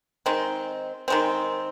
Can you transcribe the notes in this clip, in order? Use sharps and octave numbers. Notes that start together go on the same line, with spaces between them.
D#3 G#3 C4
D#3 G#3 C4